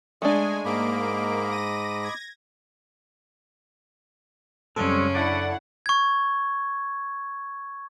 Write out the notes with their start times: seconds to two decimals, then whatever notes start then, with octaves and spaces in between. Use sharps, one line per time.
0.22 G#3 A3 D4 D#5 G#5
0.65 G#2 A#3 D#5 B5 D6 D7
1.51 A#6 D#7
2.01 G#6 A#6
4.76 F#2 C#3 G3 G#3 C4 C#4 A4
5.15 D4 E4 D5 F#5
5.86 C#6 G#6